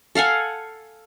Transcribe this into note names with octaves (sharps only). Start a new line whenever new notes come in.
A4 F5 F#5 G#5